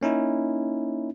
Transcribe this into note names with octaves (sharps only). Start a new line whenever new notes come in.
A#3 C#4 D#4 E4